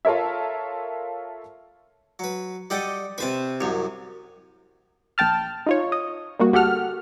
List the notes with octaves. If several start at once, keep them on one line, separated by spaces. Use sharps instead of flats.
F4 A4 A#4 C#5 E5
F#3 B4
G3 A4 D5 D#5 F#5 G5
C3 B4 C5 A5 C#6
C2 F#2 C5 C#5
A#1 G5 A5 F6
D#4 F4 C#5
D#5
G3 A#3 F#4
D2 F#4 G4 A4 F#5 F6